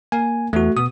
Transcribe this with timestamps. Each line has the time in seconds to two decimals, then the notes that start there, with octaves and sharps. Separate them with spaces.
0.12 A#3 G#5
0.53 E2 A3 F#4
0.77 B2 D#6